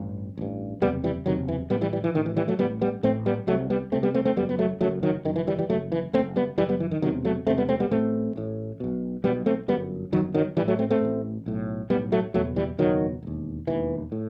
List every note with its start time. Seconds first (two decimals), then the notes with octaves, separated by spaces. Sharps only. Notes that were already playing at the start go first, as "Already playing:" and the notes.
Already playing: A1 G2
0.38 A1 G2
0.81 F#1 E2 C3 G3 B3
1.04 E3 G3
1.26 F#1 E2 C3 D#3 F#3
1.48 E3
1.70 A2 G3 B3
1.75 A1
1.81 E3 G3
1.93 E3 G3
2.04 E3
2.14 A1 A2 D#3
2.26 E3
2.37 E3 G3
2.48 F#3 A3
2.59 A1 A2 G3 B3
2.81 G3 B3
3.03 A1 A2 A3 C4
3.26 G3 B3
3.47 C2 F#3 A3
3.52 C3
3.70 G3 B3
3.92 C2 C3 A3 C4
4.03 G3 B3
4.14 A3 C4
4.25 A3 C4
4.36 F#1 G3 B3
4.39 F#2
4.49 B3
4.59 F#3 A3
4.81 F#1 F#2 F#3 A3
5.03 D#3 F#3
5.25 F#2 D#3
5.28 F#1
5.36 E3
5.47 E3 G3
5.58 E3 G3
5.69 F#1 F#2 F#3 A3
5.92 E3
6.13 F#2 A3 C4
6.17 F#1
6.36 G3 B3
6.58 F#1 F#2 E3 G3
6.69 G3 B3
6.80 E3
6.91 D#3
7.02 E1 E2 C3 D#3 F#3
7.25 F#3 A3
7.47 E1 E2 C3 A3 C4
7.58 G3 B3
7.69 A3 C4
7.80 G3 B3
7.91 A1 A2 A3 C4
8.36 A1 A2
8.80 B1 B2
9.24 B1 G3 B3
9.27 B2
9.46 A3 C4
9.68 G1 G3 B3
9.72 F#2
10.12 G1 F#2 D#3 F#3
10.34 D#3 F#3
10.57 A1 E3 G3
10.61 A2
10.68 F#3 A3
10.79 A3 C4
10.90 A3 C4
11.01 A1 A2
11.46 B1 A2
11.90 B1 G3 B3
11.93 A2
12.12 F#3 A3
12.34 F#1 E2 B2 F#3 A3
12.56 E3 G3
12.78 F#1 E2 B2 D#3 F#3
13.23 E1 D#2
13.67 E1 D#2 E3
14.12 A2